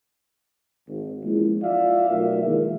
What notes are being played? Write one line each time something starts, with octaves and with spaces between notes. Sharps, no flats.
G#1
E2 E3 F3 G#3 A#3 C#4
F4 D5 E5 F5
B1 A3 F4 A#4 E5
D#3 E3 G#3 A#3